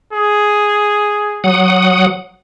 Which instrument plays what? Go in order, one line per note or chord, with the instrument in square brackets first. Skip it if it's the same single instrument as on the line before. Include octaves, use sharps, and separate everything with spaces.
[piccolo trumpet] G#4
[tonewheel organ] F#3 F#5 D#6